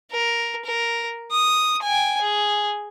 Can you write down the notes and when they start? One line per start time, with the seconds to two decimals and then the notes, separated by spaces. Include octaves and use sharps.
0.12 A#4
0.65 A#4
1.31 D#6
1.82 G5 G#5
2.22 G#4